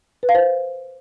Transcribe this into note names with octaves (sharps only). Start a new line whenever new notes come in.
B4
F5
C5